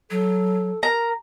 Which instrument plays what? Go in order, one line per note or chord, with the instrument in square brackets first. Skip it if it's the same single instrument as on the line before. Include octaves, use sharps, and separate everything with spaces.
[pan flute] F#3 [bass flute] A4
[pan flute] A#4 [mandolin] A#5